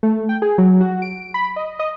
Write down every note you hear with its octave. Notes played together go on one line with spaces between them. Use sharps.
A3
G5
G#4
F#3
F#4
D7
B5
D#5
D#5